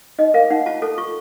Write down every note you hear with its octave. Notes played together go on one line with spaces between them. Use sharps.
D#4 D#5
A#4 F5
D#4 F#5
F4 A5
A4 A5
F4 C#6